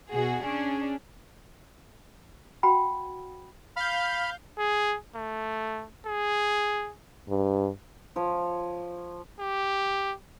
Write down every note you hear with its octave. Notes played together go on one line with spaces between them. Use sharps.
B2 F#4 G#4
C#4 D4 G#4
F#4 F#5 G5 B5
F5 B5 F6 G6
G#4
A3
G#4
G2
F3 C#5
G4